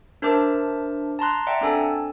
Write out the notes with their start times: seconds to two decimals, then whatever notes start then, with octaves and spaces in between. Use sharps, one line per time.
0.22 D4 A#4 C5 E5 A5 D6
1.19 A5 A#5 C6 F#6
1.47 D5 E5 F#5 G5 A#5
1.61 C4 D4 A4 G#5 A5